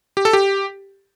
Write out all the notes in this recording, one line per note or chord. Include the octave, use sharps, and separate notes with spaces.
G4
A4
G4